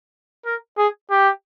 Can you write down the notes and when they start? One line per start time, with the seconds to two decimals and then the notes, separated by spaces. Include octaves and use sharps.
0.46 A#4
0.78 G#4
1.11 G4